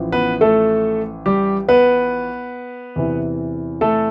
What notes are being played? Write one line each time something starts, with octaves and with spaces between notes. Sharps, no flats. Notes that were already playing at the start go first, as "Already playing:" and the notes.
Already playing: A1 A2 F3
B3 B4
A3 A4
G3 G4
B3 B4
E2 C3 E3
A3 A4